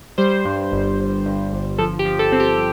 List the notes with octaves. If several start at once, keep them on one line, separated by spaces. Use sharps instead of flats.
G3 C5
G2
G1
G1
G2
G1
F3 A4
G4
F3
A4
C4
G4